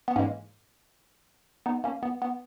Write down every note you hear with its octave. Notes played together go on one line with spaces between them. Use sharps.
B3
G#2 E3 G#3 A#3 C#4
B3 D#4
A#3 C#4
B3
B3